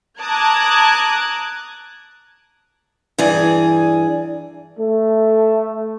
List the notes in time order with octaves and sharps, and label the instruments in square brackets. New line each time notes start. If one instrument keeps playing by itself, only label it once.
[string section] A5 A#5 D6 D#6 F#6 G#6
[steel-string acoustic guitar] G2 E3 G#4 D5
[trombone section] A3